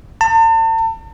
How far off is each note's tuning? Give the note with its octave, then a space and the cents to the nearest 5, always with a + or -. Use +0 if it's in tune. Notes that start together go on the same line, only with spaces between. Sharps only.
A5 +40